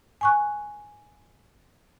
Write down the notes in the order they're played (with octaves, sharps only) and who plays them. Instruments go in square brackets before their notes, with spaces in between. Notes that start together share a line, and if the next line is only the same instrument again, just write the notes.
[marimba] G#5 C#6 F#6